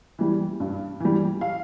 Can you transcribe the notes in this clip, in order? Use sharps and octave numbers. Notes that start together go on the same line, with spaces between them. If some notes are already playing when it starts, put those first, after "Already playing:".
E3 G3
G2
E3 G3
F5